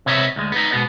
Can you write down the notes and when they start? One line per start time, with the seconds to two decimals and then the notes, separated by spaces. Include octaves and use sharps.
0.06 C3 B3 C#5 D#5 E5
0.36 D2 G#3
0.52 B3 D#4
0.72 G#2 B2 B3